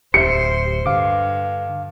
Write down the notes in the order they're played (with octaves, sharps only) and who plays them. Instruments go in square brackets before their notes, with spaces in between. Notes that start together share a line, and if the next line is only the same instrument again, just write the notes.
[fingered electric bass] D1 [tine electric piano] G4 E5 [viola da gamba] C5 [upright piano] C#7
[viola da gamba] G2 [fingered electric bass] D3 [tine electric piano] F5 D6